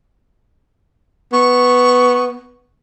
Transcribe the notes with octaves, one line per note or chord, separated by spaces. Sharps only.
B3 C#6